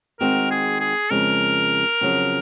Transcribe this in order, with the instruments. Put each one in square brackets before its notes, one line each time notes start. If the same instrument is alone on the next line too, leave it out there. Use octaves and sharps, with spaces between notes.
[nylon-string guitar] D#3 G#3 C4 F#4 [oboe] A#4
[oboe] G#4
G#4
[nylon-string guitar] F2 C#3 G#3 [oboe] A#4
[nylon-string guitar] F2 C#3 F#3 C#4